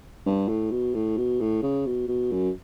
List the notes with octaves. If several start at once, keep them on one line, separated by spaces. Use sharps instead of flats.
G2
A2
B2
A2
B2
A2
C#3
B2
B2
F#2